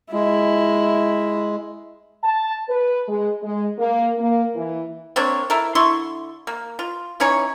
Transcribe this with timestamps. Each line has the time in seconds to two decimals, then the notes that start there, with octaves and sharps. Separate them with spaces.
0.13 G#3 E4
2.23 A5
2.68 B4
3.07 G#3
3.42 G#3
3.78 A#3
4.17 A#3
4.54 E3
5.16 A#3 C4 D4 C#5
5.50 E4 A4 A#4
5.75 D3 E4 C6 C#6
6.47 A#3
6.79 F4
7.20 E3 C#4 D#4 C#5